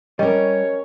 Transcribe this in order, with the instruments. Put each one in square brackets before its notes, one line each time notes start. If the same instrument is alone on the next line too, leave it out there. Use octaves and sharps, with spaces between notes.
[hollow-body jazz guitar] G3 [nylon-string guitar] C#4 A#4 [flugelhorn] C#5 [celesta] D#5